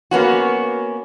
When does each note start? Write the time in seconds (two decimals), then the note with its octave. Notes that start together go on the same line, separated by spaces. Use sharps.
0.11 A#3 B3 C#4 F#4